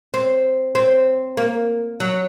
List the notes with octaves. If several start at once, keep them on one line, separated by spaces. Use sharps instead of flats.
C4
C4
A#3
F#3